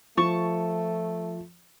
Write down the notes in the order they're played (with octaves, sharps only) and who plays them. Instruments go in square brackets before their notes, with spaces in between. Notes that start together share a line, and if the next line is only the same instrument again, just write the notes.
[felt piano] F3 [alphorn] A3 [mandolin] A5 C#6